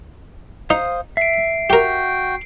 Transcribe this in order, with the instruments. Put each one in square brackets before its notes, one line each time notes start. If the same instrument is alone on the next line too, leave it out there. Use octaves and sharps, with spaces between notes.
[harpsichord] D#4 [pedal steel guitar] C5 F5 D#6
[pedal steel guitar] E5 [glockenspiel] C7 D7
[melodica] F#4 G5 [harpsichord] G4 A#4